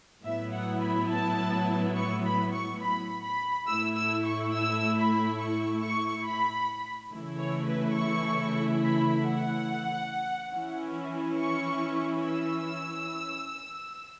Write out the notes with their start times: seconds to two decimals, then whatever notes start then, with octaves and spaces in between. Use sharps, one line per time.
0.25 A2 F#3 B3 E4 E5
0.52 F#5
0.81 B5
1.10 A5
1.95 C#6
2.25 B5
2.53 C#6
2.81 B5
3.24 B5
3.67 A2 A3 E4 E6
3.96 E6
4.25 C#6
4.54 E6
4.96 B5
5.39 C#6
5.82 C#6
6.24 B5
7.11 C#3 E3 A3 E4
7.39 C#5
7.67 B4
7.96 C#6
8.82 B5
9.25 F#5
10.53 E3 C#4 E4
11.39 C#6
12.25 E6